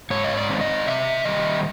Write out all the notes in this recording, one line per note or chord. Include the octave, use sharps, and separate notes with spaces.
G#2 C#5
D#5
D5
D#3 G#3 C4
D#5
C3 E5
D#3 G3 D#5